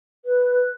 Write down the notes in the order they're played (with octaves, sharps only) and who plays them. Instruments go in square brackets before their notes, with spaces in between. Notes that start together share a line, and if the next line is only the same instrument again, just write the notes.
[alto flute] B4